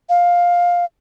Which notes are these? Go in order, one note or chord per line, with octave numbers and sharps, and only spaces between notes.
F5